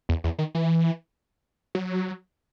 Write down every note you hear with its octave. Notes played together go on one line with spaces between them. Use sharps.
E2
E2
D#3
E3
F#3